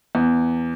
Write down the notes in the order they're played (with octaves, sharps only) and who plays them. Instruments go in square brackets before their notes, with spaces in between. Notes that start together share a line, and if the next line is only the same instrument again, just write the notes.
[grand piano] E2